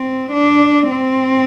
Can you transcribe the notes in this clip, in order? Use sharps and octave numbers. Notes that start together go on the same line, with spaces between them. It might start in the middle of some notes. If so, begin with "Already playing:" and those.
Already playing: C4
D4
C4